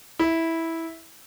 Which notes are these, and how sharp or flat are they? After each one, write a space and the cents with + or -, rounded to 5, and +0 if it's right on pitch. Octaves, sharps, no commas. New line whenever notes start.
E4 -10